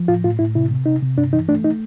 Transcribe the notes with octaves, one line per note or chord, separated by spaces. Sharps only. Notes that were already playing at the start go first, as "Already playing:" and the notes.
Already playing: F3
A2 F4
A2 F4
A2 E4
C3 E4
C3
C3 D#4
C3
G2 D4
E3 D#4
A3 D4
D#4